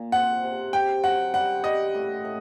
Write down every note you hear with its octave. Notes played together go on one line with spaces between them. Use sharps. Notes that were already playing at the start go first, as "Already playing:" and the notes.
Already playing: A#2
C4 F#5
C3
G4 G5
F#3 F#5
G3 F#5
G3 D#5
A2
A2